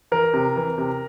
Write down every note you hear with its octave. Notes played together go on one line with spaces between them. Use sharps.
E3 A#4
C3
E3
C3